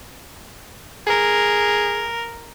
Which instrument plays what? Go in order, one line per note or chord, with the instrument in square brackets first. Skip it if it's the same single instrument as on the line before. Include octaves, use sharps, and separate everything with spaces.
[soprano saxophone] G#4 [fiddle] A#4